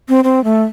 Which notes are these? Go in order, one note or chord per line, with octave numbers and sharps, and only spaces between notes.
C4
C4
A3